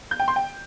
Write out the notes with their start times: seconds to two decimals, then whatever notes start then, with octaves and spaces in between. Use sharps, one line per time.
0.11 G6
0.20 G5
0.28 C6
0.36 G5